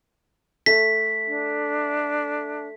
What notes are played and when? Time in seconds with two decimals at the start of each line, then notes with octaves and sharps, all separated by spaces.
0.66 A3 B6
1.27 D4